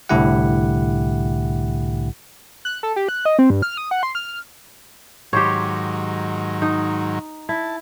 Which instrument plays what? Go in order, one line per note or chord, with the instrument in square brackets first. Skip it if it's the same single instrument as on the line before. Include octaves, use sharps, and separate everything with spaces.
[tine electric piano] C2 A2 D3 E4 G4 F#5
[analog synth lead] F#6
A4
G4
F#6
D#5
C4
G2
F6
D#6
F#5
C6
F6
[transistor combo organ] G#2 D#3 F#3 [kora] G4 C5 C#5
[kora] D#4
[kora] E4 [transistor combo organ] A5